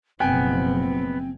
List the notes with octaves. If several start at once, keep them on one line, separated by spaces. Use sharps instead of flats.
F#1 B2 F3 B3 C4 G5 G#5